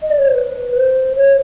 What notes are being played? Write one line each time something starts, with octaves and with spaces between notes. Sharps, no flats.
D#5
D5
C#5
C5
B4
C5
C#5